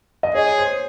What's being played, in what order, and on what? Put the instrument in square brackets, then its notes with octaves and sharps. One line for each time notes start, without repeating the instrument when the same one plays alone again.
[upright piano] D#5
[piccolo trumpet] G#4 [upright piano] C#5
[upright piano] C5